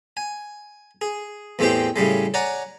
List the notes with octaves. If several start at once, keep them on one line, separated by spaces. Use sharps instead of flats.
G#5
G#4
E2 A2 G#3 C4 G4 G5
A2 C#3 G3 G#3
C#5 D5 F#5 G#5 A#5